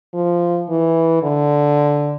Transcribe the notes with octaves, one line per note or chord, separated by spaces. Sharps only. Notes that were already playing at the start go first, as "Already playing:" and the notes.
F3
E3
D3